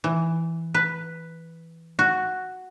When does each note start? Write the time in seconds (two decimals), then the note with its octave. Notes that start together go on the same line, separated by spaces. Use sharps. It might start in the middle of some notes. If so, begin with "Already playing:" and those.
0.04 E3
0.74 B4
1.99 F#4